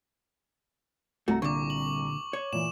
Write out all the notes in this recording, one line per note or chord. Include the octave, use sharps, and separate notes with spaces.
C2 A3 F#4 A#5
A#2 D3 C#6 D6
F#7
C#5
A#2 E3 E7